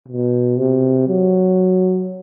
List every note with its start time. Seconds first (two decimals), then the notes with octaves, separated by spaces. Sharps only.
0.08 B2
0.57 C3
1.08 F#3